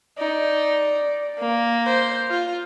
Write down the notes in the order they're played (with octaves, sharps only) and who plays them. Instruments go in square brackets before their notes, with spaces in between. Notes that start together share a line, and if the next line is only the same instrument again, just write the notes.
[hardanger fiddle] D#4 [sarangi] D5
[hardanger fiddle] A#3
[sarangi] C5
F4